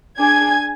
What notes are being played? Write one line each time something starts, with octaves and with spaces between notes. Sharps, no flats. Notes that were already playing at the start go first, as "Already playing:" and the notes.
D4 G#4 G#5 G#6